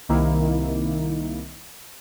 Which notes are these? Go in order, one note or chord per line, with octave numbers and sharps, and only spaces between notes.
C2 D#3 A#3 E4